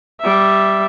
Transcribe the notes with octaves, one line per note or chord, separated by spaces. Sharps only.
G3 E5